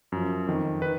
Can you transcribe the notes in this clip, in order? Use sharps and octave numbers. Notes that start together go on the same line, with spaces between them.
F#2 F3
F2 D#3
D#3 B4